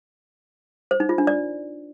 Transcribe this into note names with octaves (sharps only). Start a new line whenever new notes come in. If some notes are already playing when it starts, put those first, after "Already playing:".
C5
D#4
F4
D4
D5